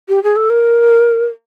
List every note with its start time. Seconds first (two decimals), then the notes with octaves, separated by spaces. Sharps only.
0.09 G4
0.23 G#4
0.36 A4
0.50 A#4